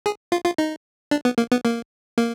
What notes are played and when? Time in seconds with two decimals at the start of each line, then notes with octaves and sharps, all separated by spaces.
0.06 G#4
0.32 F4
0.45 F4
0.58 D#4
1.11 D4
1.25 B3
1.38 A#3
1.52 B3
1.65 A#3
2.18 A#3